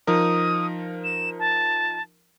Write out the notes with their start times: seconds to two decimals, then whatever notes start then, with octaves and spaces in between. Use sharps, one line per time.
0.07 F3 D#4 A#4 D#6
1.04 E7
1.39 A5